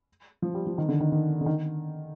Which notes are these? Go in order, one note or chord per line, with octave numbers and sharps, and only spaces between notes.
F3
G3
F3
D#3
D3
D#3
D#3
D3
D#3